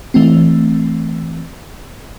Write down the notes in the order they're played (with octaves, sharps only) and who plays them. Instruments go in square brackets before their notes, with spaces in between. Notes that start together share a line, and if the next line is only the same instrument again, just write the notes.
[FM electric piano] E3 A3 C4